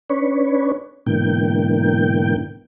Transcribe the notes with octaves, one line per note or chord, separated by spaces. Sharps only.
C#4 D4 B4 C#5
G#2 B2 D3 E3 A#3 G5